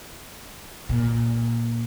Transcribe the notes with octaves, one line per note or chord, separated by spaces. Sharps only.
A#2